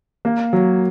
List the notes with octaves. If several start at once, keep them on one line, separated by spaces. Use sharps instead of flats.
A#3
F#3